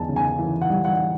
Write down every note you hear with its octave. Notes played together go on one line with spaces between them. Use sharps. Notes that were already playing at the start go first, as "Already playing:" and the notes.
Already playing: E2 G#5 A5
C#3
G#5
E3
F#5
G3
F#5